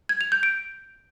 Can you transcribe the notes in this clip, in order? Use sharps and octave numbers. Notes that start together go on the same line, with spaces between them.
G#6
F7
G6
D7